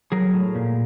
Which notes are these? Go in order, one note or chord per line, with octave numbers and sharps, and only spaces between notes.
F#3 G#4 A#4
A2
A#2